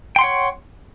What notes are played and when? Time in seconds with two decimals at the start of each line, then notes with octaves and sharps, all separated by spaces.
0.16 G5
0.19 C6
0.21 F#5
0.24 C#5